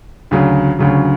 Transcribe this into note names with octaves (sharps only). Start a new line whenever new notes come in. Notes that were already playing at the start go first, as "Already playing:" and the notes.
D2 C#3 F#3
D2 C#3 F#3